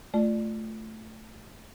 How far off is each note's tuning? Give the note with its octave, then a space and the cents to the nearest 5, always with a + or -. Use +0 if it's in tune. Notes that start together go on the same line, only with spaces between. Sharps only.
A3 +0 F4 +0 D5 +15